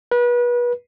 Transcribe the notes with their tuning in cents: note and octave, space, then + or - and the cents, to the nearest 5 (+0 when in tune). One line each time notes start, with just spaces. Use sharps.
B4 -30